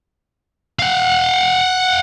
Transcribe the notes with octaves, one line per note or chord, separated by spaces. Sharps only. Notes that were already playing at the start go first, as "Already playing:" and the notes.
F5 F#5